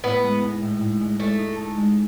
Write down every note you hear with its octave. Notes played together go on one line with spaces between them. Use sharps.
A2 B3
G#3
D#4
A2
A2
G#3
G#3 A3
D#4
A4
G#3